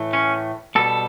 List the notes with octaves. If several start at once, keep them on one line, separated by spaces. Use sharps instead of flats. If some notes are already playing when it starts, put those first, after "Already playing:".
Already playing: A2 E3 A3
C#4
B2 G3 A4